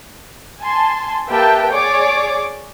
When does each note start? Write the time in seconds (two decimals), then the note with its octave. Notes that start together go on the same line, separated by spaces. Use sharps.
0.60 G#5 A5 C6
1.28 A#3 G4 B4 E5 G5 A5
1.71 G#4 C#5 D5 D6